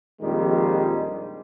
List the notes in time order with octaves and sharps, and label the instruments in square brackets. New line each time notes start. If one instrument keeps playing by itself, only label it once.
[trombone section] A#1 F2 D#3 G3 G#3